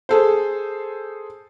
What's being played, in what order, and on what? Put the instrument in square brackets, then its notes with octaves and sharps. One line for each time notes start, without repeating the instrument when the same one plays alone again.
[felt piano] G#4 A4 C5